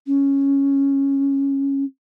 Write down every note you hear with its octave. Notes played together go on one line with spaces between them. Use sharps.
C#4